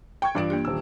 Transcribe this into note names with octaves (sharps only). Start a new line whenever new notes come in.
G5 C#6 G#6
G2 E3 F4 D5 D7
A#3 D4 G4
D#1 E6